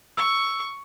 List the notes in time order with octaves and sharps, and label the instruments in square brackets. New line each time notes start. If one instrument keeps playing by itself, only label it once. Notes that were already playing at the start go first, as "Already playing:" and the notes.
[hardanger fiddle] C#6 [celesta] E6